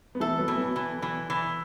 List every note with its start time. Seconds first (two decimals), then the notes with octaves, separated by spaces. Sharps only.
0.15 B3
0.20 E3 A3 A4
0.38 F#3 B3
0.48 E3
0.57 F#3 B3
0.76 E3
1.02 E3
1.30 E3